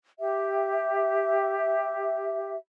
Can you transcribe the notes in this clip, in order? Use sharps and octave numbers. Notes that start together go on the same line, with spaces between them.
G4 E5